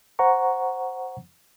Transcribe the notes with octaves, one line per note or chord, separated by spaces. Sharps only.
C5 F#5 A#5 C#6